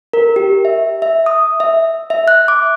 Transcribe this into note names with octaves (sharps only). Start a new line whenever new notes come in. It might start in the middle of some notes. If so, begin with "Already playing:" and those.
A#4
G4
E5
E5
D#6
E5
E5
F#6
D6